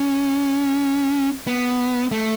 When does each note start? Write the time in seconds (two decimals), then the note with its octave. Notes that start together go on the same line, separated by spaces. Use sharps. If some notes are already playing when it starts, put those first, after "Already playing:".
Already playing: C#4
1.47 B3
2.12 A3